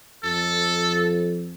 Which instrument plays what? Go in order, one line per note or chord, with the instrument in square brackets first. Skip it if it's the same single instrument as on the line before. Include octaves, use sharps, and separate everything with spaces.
[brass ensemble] F2 [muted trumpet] A4